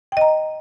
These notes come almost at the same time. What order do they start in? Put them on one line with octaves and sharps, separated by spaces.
G5 D#5 A#5